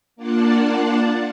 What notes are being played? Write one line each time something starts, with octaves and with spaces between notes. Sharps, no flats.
A#3 D4 F4 D5 F#5 A5